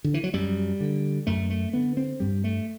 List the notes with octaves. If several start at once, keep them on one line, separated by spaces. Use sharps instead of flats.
D3
E3
F#3
F#2 G3
D3
F#2 A3
A3
D3 B3
C4
G2 G3
A3